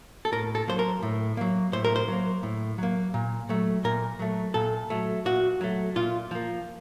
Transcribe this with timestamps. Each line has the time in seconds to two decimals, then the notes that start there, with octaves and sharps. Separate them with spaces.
0.25 A4
0.32 A2 A#4
0.55 A4
0.68 F#3 A#3 C5
0.79 A#4
1.03 A2
1.37 F#3 A#3
1.72 A2 C5
1.85 A#4
1.96 C5
2.08 F#3 A#3
2.43 A2
2.78 F#3 A#3
3.14 A#2
3.49 F#3 A3
3.84 A#2 A#4
4.19 F#3 A3
4.54 A#2 A4
4.90 F#3 A3
5.25 A#2 F#4
5.61 F#3 A3
5.96 A#2 F4
6.31 F3 A#3